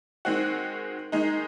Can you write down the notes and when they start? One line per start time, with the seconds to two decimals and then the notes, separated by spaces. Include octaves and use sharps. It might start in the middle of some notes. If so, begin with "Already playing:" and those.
0.25 D#3 G#3 C4 F#4
1.12 D#3 G#3 D#4